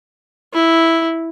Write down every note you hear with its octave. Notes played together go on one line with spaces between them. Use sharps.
E4